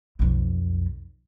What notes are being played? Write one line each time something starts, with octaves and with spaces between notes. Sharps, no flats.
B1 F2